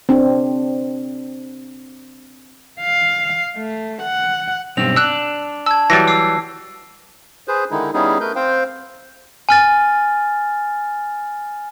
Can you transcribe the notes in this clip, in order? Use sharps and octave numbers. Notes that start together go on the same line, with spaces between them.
C4 D4
F5
A3
F#5
B1 G2 C4 F7
D4 E6 F#6
A5 E6 G#6
E3 F#3 G3 A6 A#6
D6 E6 C7
G#4 B4 C5
D3 D#3 G#3 D#4 E4
G3 B3 C#4 D#4 E4 G#4
A3 A#4 B4 G6
C4 C5 F5 G5
G#5 F6 A6